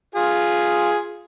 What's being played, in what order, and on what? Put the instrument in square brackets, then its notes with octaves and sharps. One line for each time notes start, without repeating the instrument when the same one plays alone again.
[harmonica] F4 G#4